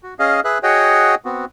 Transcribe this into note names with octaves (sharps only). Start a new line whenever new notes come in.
F#4
C#4 G#4 D#5 F5
G#4 B4 E5 F#6
F#4 G#4 C#5 D#5 F#5 G5
B3 C4 F#4